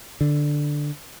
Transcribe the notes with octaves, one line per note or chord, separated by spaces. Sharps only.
D3